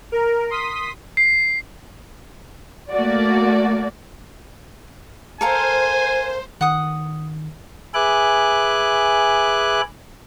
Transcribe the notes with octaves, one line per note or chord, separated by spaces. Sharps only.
A#4
C6 D#6 B6
C7
A3 A#3 F#4 D5
A4 A#4 C5 F5 G#5
D#3 F#5 D#6
G#4 B4 E5 G#5 D6 F#6